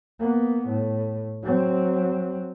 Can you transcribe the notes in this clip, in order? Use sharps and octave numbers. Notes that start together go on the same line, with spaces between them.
A#3 B3
A2
F#3 C4